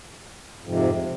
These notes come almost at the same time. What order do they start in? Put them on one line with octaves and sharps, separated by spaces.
F2 G#2 C3